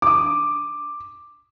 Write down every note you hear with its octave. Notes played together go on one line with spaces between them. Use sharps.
D6 D#6